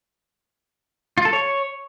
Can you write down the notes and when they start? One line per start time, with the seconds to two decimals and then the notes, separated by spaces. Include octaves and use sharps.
1.18 F4
1.25 A4
1.33 C#5